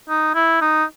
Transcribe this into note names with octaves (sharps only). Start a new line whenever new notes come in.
D#4
E4
D#4